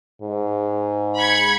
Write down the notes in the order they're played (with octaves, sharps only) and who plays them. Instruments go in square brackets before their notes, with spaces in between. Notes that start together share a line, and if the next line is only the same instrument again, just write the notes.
[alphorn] G#2
[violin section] B5 G#6 C#7